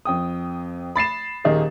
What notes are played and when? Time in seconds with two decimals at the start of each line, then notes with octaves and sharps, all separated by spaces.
0.05 F2 G5 D#6
0.96 B5 A6 C7 E7
1.44 D#1 D#3 D#4 G#4